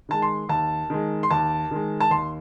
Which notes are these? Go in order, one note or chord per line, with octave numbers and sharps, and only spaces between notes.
D#3 G#3 A5
C6
D#2 A5
D#3 G#3
C6
D#2 A5
D#3 G#3
A5
D#2 C6